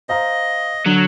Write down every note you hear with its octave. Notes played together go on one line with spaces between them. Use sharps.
C5 D#5 F5 A#5
D3 F#3